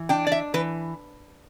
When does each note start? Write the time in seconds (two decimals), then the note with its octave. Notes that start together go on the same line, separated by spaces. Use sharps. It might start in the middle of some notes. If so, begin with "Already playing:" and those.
Already playing: E3
0.09 D4 G5
0.27 D5
0.32 E5
0.54 E3 B4